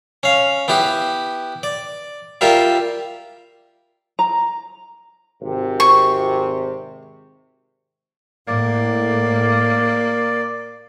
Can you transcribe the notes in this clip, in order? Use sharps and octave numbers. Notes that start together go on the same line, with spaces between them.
C#4 F5
B3 E4 G4 B4
D5
G3 F4 G4 A#4 E5
A#5
G#1 C3
C#6
A2 A#3 D5